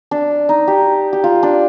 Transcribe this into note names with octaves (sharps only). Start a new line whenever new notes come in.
D4
D#4
G4
G4
F4
D4